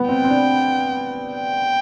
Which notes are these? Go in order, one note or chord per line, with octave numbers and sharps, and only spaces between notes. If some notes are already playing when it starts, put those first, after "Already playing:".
Already playing: G3 B3
C4 G5
C4
D4
G5